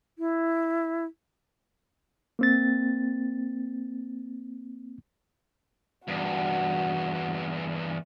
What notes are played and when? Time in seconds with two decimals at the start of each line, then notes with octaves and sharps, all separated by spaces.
0.19 E4
2.39 A#3 C4 A6
6.08 E2 G2 F#4